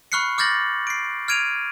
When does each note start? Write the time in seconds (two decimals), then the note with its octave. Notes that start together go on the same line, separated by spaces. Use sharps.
0.12 B5 C#6 F6 F#6 C7 C#7
0.38 D6 F6 G6 A6 A#6 F#7
0.87 C7 D7
1.28 F6 G#6 D7 D#7 F7